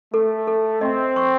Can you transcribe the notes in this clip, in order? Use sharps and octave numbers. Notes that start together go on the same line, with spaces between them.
A3 A4
A4
C4 D#5
C#6